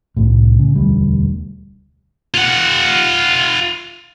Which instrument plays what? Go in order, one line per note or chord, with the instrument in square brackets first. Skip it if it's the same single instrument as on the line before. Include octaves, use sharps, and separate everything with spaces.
[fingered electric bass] C2 A2
C#3
E1 D2 G3
[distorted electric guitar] F4 F#5